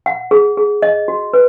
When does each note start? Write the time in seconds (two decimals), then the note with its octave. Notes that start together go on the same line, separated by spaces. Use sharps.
0.06 F#5
0.31 G#4
0.57 G#4
0.82 D#5
1.08 F#4
1.33 B4